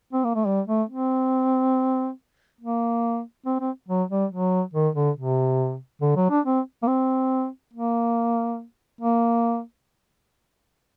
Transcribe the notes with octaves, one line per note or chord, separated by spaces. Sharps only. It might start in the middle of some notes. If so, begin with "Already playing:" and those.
C4
A#3
A3
G3
A3
C4
A#3
C4
C4
F#3
G3
F#3
D#3
D3
C3
D3
F#3
D4
C4
A#3
C4
A#3
A#3